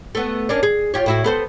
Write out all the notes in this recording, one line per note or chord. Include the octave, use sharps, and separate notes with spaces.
A3 B3
A#3 C#4 D4
G#4
F4 G4 C#5
A2 E4 F#4
B3 A4 C5